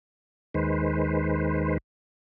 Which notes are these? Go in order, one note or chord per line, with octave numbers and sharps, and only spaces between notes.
D#2 D#3 G#3 B4 C5